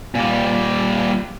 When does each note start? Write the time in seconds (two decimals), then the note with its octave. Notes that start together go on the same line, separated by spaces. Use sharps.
0.15 A#2 G3